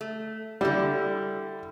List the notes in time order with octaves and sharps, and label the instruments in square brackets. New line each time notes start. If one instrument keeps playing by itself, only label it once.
[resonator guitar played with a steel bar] A3
[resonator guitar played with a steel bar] D3 E4 [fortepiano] G3